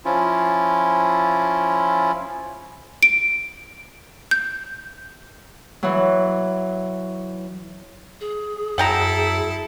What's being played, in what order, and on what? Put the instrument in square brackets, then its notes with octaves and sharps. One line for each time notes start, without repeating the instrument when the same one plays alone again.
[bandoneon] F3 C#4 E4 F4
[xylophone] D7
G6
[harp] E3 F#3
[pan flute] G#4
[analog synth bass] F#2 [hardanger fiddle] E4 A4 [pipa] F#5 G5 A#5